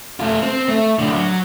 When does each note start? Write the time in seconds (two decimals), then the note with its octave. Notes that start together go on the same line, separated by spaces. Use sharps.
0.20 A3 F4
0.43 C4
0.69 A3
0.99 A2 D3
1.15 F#3